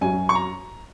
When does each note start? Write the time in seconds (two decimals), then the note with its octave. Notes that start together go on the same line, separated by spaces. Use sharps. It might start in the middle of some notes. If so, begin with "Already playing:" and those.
0.01 F#2 F#3 C#4 G#5
0.29 C#6
0.35 A#5